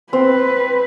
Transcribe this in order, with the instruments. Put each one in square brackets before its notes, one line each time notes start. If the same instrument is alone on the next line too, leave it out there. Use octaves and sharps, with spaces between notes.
[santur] C4 [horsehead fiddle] B4